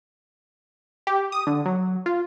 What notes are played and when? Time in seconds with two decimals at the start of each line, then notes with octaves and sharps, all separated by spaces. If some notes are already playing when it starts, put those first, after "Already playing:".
1.07 G4
1.32 D#6
1.47 D3
1.66 F#3
2.06 F4